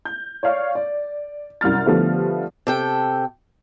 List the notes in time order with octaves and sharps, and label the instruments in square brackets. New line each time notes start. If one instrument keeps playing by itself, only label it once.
[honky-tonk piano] G6
C#5 D5 F5 C#6
D5
C2 F#2 F6 A6
D3 F3 G3 A3 B3
[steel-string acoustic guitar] C3 A4 G5